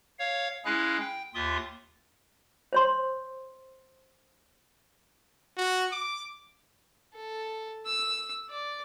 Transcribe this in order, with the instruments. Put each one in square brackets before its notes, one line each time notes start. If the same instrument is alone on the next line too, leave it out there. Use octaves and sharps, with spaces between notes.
[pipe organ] C#5 F5
G#3 C#4 E4 G#4 F5 F#6
G5
D#2 F4 E5 C6 D#6
[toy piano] C5 C#5 C6
[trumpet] F#4
D6
[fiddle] A4
E6
D5